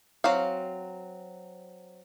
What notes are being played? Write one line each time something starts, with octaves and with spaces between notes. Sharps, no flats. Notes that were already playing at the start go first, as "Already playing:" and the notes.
F#3 C4 F5